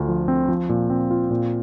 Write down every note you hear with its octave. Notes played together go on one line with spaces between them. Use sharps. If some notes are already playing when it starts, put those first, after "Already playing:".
Already playing: D2 D3 D4 F4
F3
C4
F3
A#2
C4
F4
A#2